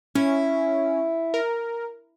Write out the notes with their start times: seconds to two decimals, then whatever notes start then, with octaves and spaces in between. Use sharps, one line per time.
0.15 C#4 E4
1.34 A#4